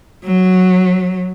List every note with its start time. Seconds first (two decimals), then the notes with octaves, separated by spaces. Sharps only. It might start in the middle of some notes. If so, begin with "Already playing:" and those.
0.25 F#3